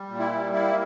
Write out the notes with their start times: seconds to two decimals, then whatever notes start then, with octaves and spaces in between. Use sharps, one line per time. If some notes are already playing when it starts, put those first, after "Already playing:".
Already playing: G3
0.08 A#2
0.19 E4
0.31 G3
0.52 A#3 E4